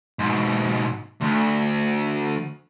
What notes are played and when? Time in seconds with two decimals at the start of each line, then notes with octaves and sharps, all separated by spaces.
0.19 G#2 B2
1.21 D2